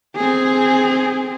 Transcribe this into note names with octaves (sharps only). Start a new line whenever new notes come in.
C4 G#4